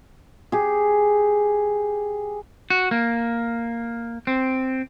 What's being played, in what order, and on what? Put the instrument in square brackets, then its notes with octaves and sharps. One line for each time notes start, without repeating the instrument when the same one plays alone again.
[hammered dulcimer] G4 G#4
[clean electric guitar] F#4
A#3
C4